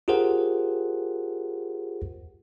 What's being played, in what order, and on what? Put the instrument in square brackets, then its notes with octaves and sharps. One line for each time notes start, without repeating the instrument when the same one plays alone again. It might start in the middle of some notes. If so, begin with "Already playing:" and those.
[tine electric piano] F4 G4 G#4 A#4 C5 F#5